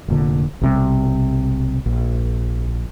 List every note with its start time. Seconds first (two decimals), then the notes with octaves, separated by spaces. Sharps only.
0.08 F1 A#2 D3
0.61 B1 C3 G3
1.86 A#1